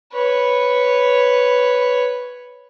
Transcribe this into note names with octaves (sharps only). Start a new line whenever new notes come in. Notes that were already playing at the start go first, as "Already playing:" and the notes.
B4 C#5